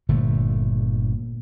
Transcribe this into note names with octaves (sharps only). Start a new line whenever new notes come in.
G1 A#2 D3 A3